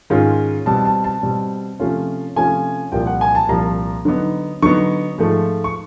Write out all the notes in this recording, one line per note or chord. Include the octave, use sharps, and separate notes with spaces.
G#2 D#3 G#3 C#4 F4
B2 G3 C4 A5
A5
A5
B2 G3 C4
C3 F3 A3 C#4 F4
C3 F3 A3 C#4 F4 G#5
C2 A#2 F3 G5
F#5
G#5
A5
C2 A#2 F3 A#5
D3 F#3 B3 D#4
D3 F#3 B3 D#4 C#6
G#2 F3 A3
C#6